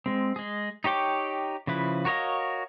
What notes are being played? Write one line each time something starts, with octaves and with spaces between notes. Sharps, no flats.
G#3 C4
G#3 G#4
D#4 G4 C#5 G5 D6
C#3 F3 E4 B4
F#4 A#4 C#5 D#5 F5